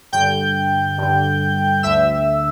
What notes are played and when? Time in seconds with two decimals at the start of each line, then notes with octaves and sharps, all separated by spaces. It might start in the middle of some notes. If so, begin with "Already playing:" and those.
0.12 G2 D3 G5 G6
0.98 G2 D3
1.83 D2 D3 E5 E6